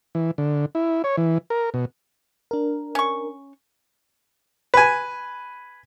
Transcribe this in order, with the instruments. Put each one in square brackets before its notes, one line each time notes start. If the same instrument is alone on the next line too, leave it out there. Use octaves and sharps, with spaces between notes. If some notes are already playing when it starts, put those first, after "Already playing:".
[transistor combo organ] E3
D3
E4
C#5
E3
A#4
B2
[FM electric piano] D4 A#4
[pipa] C#4 C#6
[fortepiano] B4 G#5